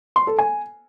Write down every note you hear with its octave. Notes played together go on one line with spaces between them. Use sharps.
C6
A4
G#5